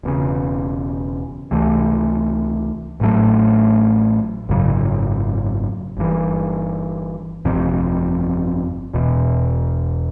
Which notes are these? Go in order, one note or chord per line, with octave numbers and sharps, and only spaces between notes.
E1 E2 C#3
C#2 C3 E3 A3
A1 A2 F#3 A3
G#1 F#2 C#3 F#3
G1 G2 E3
G1 F2 C3
E1 E2 B2